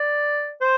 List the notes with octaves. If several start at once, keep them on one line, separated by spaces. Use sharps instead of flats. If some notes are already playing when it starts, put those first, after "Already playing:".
Already playing: D5
C5